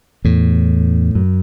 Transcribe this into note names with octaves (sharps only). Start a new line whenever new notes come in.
E2 A2
F#2